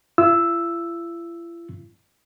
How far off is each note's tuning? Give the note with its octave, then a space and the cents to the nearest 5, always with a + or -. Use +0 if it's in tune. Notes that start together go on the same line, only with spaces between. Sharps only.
E4 +45 E6 +0